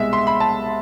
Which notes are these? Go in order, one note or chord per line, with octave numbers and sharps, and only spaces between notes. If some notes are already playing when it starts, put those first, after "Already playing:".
Already playing: C2 B2 G#3 E5
C6
B5
A5